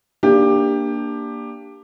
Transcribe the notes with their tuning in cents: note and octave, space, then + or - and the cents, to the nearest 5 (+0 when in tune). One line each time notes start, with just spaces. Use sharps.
A#3 +0 D4 +0 G4 +15